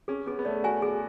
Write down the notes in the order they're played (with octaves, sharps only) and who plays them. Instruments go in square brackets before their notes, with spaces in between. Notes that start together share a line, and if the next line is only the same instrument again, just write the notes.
[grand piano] C#4 [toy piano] G#4
[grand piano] B3 [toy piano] G#4
[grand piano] B3
[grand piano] A3 [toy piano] D5
[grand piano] F#4 [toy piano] G#5
[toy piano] G#4